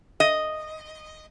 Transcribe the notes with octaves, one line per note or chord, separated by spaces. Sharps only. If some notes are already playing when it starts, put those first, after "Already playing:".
D#5